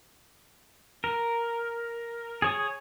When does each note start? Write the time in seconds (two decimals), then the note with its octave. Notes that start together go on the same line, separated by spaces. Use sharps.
1.04 A#4
2.42 G#4 C#5 D#6